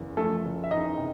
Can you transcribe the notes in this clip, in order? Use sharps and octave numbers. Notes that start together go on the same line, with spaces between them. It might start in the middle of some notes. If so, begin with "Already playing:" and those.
Already playing: F#1 E2
F3 A3 A4
F#1
E5
E2 D#4 D#5
C3